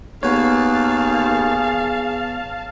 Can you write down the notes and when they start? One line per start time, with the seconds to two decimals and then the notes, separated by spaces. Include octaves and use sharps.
0.23 D#2 B3 G#4 C#5 F5 A5